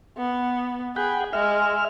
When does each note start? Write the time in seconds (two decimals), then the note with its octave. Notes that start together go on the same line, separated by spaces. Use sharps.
0.18 B3
0.96 G#4 F#5 G5 B5
1.33 G#3 E5 F6